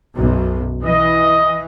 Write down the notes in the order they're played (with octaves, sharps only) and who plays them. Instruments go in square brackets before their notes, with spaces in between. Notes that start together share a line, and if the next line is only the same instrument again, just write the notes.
[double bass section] B1 F#2
[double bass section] E3 [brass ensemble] D#5